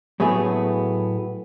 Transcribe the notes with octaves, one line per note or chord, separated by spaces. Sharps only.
A2 F#3 A3 B3 G#4